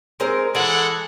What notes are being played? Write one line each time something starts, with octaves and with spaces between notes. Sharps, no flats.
G#3 C4 A#4
E3 G#3 A4 F#5